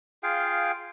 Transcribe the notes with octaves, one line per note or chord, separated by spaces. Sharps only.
F4 G#4 F5 G5